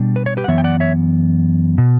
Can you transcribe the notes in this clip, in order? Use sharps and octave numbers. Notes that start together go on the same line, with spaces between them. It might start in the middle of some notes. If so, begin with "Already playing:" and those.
Already playing: B2 G3 D4
B4
C#5
G4 B4
F#5
F#2 E3 B3 C#5 E5
G5
D5 F#5
C#5 E5
B2